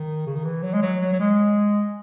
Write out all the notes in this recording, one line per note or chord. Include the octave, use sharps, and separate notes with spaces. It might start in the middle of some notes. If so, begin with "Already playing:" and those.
Already playing: D#3
C#3
D#3
E3
F#3
G#3
F#3
F#3
F#3
G#3